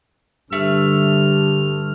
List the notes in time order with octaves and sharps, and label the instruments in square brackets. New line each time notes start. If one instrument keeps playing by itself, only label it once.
[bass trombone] G2 [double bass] D3 G3 [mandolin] A3 [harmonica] F6